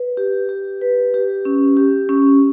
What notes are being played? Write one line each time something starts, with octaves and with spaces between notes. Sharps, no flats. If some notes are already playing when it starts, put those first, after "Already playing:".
Already playing: B4
G4
G4
B4
G4
C#4
G4
C#4